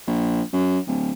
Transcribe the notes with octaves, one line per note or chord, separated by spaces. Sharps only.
A#1
F#2
D1